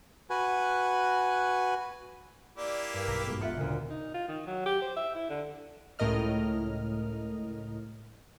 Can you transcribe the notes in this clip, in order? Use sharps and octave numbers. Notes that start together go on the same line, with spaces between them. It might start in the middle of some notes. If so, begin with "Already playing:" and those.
F#4 B4 G#5
A#3 E4 G4 D5
G2 A#4
B1 A#5 B6
G#2 B2 A4
E1 G#2 B3 F4 E5 F#5 C#7
D2 A#2 C#3 A#4
D#4
F4
D#3
F#3
G4
C5
E5
E4
D3
C#2 A2 A#4 D#5 F6